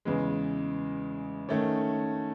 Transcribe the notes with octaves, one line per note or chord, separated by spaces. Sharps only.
E2 C#3 G#3
D#3 A3 C#4